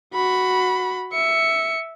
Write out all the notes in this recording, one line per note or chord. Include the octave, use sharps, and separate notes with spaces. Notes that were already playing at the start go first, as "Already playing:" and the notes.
F#4 B5
E5 C#7